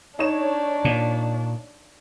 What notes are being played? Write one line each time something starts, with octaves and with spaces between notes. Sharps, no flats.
D4 D#4 C#5 E7
A#2